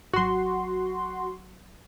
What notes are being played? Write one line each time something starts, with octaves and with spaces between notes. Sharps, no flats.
G#1 F#3 F#4 C6